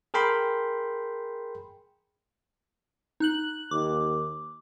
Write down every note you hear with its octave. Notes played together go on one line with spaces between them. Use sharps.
G#4 A#4 G5 B5 C6
D#4 F#6 F#7
D#2 D6